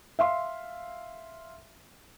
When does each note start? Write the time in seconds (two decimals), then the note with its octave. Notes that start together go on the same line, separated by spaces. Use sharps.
0.19 E5 F5 C6